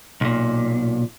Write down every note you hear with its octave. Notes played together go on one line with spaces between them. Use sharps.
B1 A#2